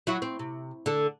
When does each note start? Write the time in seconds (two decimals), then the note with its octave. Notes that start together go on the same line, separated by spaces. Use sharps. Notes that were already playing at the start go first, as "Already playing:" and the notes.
0.07 F#3 E4 F#4
0.22 C4
0.39 C3
0.86 D3 A4